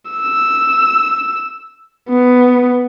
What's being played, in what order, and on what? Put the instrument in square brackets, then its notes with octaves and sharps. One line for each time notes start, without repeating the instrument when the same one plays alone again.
[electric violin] E6
B3